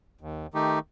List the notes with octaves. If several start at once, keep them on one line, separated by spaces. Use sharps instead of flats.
D#2
D#3 A3 D#4 G4